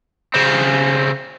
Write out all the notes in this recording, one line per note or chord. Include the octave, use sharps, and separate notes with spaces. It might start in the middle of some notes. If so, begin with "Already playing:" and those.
C#3 C4